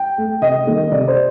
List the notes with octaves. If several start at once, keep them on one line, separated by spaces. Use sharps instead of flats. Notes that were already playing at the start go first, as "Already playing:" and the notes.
Already playing: G5
A3
C3 D#5
D#3 G3 A#3
C3 D5
C5